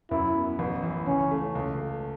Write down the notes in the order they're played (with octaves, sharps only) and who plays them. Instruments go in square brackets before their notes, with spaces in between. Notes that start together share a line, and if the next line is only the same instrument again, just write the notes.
[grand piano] F#2 [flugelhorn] E4
[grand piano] B3
A1
E3
[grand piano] C#2 [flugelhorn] C#4
[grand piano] A3
C#2
A3